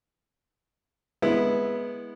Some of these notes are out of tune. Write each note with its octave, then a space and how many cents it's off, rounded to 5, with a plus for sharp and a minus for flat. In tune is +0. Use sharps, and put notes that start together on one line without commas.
G#3 +0 B3 -15 E4 +0